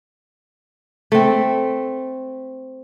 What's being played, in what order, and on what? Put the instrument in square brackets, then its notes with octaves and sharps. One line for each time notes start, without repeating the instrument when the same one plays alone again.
[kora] A3 C4